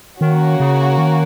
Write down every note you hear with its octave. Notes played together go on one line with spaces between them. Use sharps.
D#3 A#3 C#4 F#4
C#3
D#3